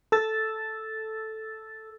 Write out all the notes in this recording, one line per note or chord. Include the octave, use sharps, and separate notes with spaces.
A4 E6 A6